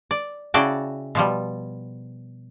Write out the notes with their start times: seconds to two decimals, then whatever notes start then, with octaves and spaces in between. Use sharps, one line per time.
0.11 D5
0.54 C#3 E4 F#4 D5 G5 A5
1.15 B2 F3 G3